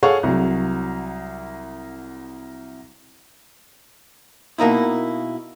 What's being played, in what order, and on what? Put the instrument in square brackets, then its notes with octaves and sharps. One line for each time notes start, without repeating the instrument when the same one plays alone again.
[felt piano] G#4 A4 C#5 F5 F#5 C#6
C2 F#3
[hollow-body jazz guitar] B2 A#3 D#4 E4